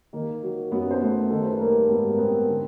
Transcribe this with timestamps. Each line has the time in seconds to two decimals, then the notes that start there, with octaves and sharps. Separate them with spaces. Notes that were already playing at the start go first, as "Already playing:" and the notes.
0.13 D#3 A#3 A#4
0.42 F#3
0.71 F#2 B3 B4
0.91 C5
1.00 A3 B3 B4
1.30 D#3 A4
1.43 C5
1.52 B4
1.59 G3 A#3 A#4
1.89 G#2 B3 B4
2.13 A#4
2.18 B3 C4 B4
2.47 D3